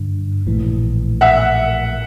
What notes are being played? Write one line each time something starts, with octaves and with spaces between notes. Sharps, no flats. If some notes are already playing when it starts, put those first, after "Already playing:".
Already playing: G2 D3
A#1 A2 E3
E5 F#5